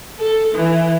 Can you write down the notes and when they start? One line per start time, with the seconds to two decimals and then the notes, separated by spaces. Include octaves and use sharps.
0.18 A4
0.53 E3